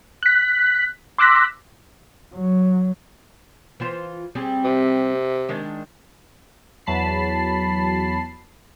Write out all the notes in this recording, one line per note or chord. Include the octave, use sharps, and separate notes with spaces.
F#6 B6
C6 D6 E6 F#6 A#6 B6
F#3
E3 F4 C5
G3 C4 G#4
C3
D#3 G#3 D4
E2 F#3 A5 B5 C7